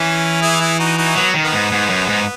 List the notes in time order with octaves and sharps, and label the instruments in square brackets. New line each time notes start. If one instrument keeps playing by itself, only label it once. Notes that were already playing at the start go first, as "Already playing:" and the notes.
Already playing: [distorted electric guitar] E3 [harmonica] C#4
[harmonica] E4 G#4
E4 G#4
D#4 F#4
D#4 F#4
[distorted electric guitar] F#3 [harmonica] B3
[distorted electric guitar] D#3
[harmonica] B3
[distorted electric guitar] G#2
G#2
F#2
G#2